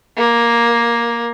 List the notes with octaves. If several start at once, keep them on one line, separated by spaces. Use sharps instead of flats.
A#3